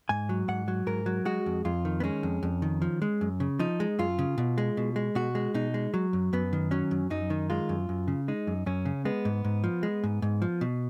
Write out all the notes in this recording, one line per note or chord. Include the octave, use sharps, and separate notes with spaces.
G#2 G#5
F#3
G#2 F#5
F#3
G#2 A#4
F#3
G#3 F#4
F2
F2 F4
D#3
B3
G#3 C#4
F2
F2
D#3
F3
G#3
F#2
C#3
F3 D#4
G#3
F#2 F4
C#3
B2
G#3
B2
G#3
B2 F#4
G#3
B2 D#4
G#3
F#3
F#2
F#2 B3
D#3
F#3 C#4
F#2
F#2 D#4
D#3
G#3 F4
F#2
F#2
C#3
G#3 D#4
F#2
F#2 C#4
C#3
G#3 B3
G#2
G#2
F3
G#3
G#2
G#2
F3
B2